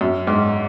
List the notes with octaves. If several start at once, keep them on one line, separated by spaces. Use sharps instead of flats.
F#2
G#2